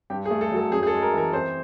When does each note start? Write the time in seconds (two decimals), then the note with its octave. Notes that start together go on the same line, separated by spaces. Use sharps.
0.10 G2 G4
0.25 G#4
0.30 A3
0.41 A4
0.51 F#3
0.56 A4
0.71 F#2 G#4
0.83 G#4
0.87 A4
0.92 G#3
1.02 A#4
1.13 E3 A#4
1.33 C4 C5